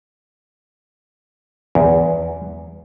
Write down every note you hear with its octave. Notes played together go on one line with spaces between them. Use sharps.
E2